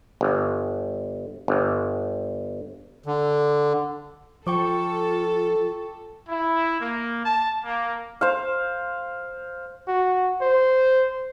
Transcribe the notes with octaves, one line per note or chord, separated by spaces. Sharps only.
G1
G1
D3
F3 F4 A4 G5 C#6 D6
E4
A#3
A5
A#3
C5 F5
F#4
C5